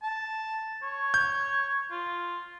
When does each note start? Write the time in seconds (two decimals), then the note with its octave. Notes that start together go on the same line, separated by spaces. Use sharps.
0.03 A5
0.83 C#5
1.14 G6
1.91 F4